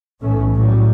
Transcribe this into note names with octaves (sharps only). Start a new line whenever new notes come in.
B1 A2 E3 A3 C#4
A2 F#3 G3